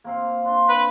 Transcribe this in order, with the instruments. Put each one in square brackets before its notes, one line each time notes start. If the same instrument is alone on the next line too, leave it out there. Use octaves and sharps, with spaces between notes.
[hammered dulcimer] A#3 C4 F5
[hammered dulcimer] D4 [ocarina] C6
[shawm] B4